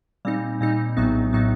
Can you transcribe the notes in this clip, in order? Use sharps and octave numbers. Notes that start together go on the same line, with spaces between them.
A#2 G3 C4 D#4
A#2 G3 C4 D#4
A#1 A2 F#3 B3 D#4
A2 F#3 B3 D#4